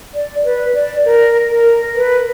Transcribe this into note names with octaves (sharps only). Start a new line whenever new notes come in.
D5
B4
D5
A#4
A#4
B4